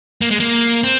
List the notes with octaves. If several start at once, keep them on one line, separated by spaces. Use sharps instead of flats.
A#3
G#3
A#3
C4